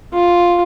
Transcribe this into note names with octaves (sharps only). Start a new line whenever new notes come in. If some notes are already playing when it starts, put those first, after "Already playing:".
F4